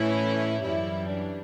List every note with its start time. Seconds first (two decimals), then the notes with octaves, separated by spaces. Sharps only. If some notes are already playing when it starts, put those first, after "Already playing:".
Already playing: A2 E3 A3 C#4 E4
0.63 F#2 E3 G3 E4
1.09 D4